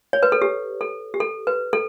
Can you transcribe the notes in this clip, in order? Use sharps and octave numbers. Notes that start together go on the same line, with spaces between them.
C#5
B4
A4
G4
A4
G4
A4
B4
A4